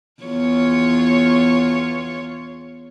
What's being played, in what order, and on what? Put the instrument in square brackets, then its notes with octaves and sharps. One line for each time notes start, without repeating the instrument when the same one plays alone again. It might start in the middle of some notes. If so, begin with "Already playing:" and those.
[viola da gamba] E2 F4 C#5